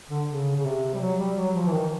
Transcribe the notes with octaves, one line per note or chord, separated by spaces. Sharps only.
D3
C#3
C#3
C3
G3
F#3
G3
F#3
F3
E3
D#3